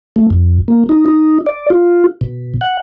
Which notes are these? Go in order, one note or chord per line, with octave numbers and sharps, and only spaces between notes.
A3
F2
A#3
D#4
D#4
D5
F4
B2
F#5